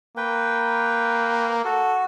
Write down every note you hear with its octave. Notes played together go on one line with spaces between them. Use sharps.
A#3 B4 G5
F#4 A4